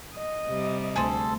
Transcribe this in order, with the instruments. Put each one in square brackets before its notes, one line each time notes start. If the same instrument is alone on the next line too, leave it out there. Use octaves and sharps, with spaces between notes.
[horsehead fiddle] D#5
[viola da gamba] C3 G3
[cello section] D2 [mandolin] G#4 A4 C5